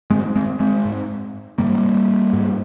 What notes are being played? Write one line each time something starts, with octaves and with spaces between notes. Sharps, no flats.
G#2 G#3 C4
G#3 C4
G#3 C4
G#2
G#2 G3 A#3
G#2